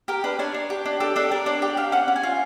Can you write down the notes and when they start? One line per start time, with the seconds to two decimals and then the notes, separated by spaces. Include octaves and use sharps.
0.08 G4 A#4
0.24 D4 B4
0.39 D4 C#5
0.54 D4
0.70 G4
0.86 D4
1.00 G4 A4
1.16 D4 A4
1.31 D4 A#4
1.46 D4 C#5
1.62 G4 D5
1.77 G4 F5
1.92 C#4 F#5
2.08 C#4
2.16 G#5
2.23 F4